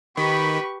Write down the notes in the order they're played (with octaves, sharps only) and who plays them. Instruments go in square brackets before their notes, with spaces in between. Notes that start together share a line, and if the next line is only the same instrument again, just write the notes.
[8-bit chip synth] D#3 [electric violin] G4 B4 [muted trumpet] B5 [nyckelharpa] C#6